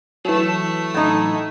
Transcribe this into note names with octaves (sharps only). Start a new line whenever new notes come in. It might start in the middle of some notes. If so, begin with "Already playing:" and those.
E3 F#3 A3
A2 D#4